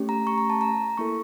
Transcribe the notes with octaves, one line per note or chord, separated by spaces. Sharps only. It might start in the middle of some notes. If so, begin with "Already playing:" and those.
Already playing: A3 C#4 G4
A#5
C#6
A#5
A5
A#5
A#3 E4 A4 C#6